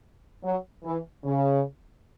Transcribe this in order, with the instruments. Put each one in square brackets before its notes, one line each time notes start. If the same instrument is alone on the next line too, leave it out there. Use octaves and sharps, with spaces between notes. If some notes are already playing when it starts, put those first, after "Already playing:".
[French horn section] F#3
E3
C#3